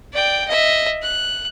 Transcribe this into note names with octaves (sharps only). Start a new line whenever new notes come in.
D5 G5
D#5 E5
F#6